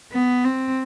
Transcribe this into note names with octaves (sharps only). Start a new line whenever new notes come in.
B3
C4